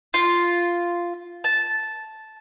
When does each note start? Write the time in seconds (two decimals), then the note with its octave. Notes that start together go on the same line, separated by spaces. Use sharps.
0.14 F4
1.44 A5